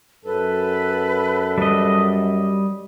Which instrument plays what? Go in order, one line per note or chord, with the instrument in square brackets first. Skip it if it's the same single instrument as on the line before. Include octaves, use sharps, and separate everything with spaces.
[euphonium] F#2 [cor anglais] A4 [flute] B4
[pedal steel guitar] G3 D#5